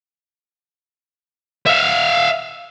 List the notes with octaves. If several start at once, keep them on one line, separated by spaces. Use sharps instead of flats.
E5 F5